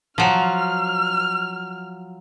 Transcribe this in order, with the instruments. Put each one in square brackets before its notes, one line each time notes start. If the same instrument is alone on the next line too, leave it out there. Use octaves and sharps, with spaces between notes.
[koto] F3 F#3 [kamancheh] F6